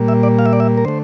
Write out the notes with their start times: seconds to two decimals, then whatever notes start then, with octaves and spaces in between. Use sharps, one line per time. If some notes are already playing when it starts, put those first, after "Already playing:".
Already playing: A#2 G3 A#3
0.08 E5
0.23 D5
0.39 F5
0.46 E5
0.53 D5
0.60 E5
0.78 A#4
0.85 D3 A3 C5